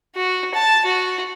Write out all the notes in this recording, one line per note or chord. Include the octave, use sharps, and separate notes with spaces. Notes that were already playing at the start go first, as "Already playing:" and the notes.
F#4
A5
F#4